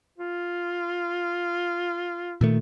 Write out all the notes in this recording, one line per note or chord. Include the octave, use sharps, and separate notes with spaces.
F4
A#2 D#3 A3